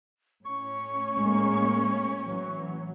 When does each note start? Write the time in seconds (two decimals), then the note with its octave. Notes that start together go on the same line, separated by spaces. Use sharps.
0.45 A2 C#4 C#6
1.18 G#3 A#3
2.23 E3 F#3